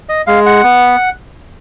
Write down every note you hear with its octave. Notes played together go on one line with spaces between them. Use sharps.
D#5
G#3 F5
F#5
B3